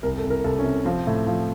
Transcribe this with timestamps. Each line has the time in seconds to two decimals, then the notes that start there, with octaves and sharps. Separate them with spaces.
0.03 C2 A#4
0.18 A4
0.24 C2
0.30 A#4
0.44 C2 A4
0.59 C#4
0.65 C3
0.85 F3 C4
1.07 A2
1.27 F3